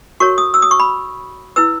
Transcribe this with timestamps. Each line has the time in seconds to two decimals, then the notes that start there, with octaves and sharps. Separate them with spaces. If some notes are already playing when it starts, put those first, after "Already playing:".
0.20 F#4 A#4 C#5 C#6
0.38 D#6
0.54 E6
0.62 D#6
0.71 C#6
0.80 B5
1.56 E4 B4 E6